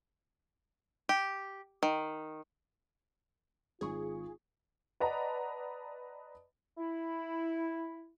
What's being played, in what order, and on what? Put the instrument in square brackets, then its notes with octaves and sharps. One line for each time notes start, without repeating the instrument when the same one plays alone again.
[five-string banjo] G4
D#3
[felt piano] G#1 C#6 [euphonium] F4 [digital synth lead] G#4
[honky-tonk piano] B4 D5 D#5 F#5 A5 A#5
[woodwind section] E4